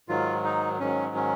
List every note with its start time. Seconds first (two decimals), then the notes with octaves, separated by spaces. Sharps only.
0.09 G#2 D#3 F#3 F4
0.44 D#4
0.80 G#2 D#3 F#3 C#4
1.16 C#4